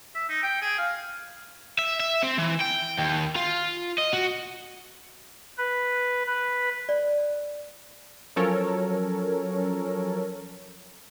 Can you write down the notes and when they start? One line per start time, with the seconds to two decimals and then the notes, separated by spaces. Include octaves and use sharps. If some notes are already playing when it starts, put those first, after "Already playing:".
0.15 E5
0.29 D#4
0.42 G5
0.61 G#4
0.78 F5
1.79 E5
2.00 E5
2.23 C4
2.38 E3
2.60 G5
2.98 D#2
3.35 F4
3.98 D#5
4.13 F#4
5.58 B4
6.27 B4
6.89 D5
8.36 F3 F#3 C#4 A4 A#4 C#5